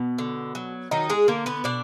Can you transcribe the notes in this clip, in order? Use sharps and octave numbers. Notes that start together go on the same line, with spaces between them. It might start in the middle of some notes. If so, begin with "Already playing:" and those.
Already playing: B2 B3
D3
F#3
D#3 F#3 D#4
G#3 G#4
D3 A#3 A#4
B3 B4
B2 D4 D5